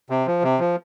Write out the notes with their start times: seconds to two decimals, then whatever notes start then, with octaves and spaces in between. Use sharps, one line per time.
0.10 C3
0.27 F3
0.43 C3
0.59 F3